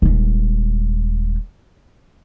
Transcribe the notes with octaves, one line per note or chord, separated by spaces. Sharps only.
D#1 G#3